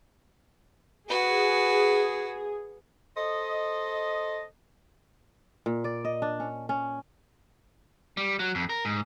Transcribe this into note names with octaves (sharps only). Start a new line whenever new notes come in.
F#4 G#4 B4
A4 C5 D#5
A#2
D5
D#5
D4
C#4
C#4
G3
F#3
F2
A#4
G#2